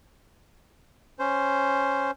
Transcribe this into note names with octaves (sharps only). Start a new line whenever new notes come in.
C#4 C5